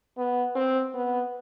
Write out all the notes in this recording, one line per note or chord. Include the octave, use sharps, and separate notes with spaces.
B3
C4
B3